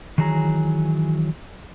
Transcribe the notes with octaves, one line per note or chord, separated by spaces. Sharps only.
D#3 E3 F#3 G#4 A#5